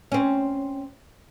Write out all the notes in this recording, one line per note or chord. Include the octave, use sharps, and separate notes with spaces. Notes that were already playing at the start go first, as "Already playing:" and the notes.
C4 C#4